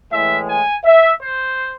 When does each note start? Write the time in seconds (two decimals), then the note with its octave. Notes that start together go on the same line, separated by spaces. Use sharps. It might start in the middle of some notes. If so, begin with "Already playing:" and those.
0.10 A2 E3 G#3 E5
0.47 G#5
0.84 E5
1.21 C5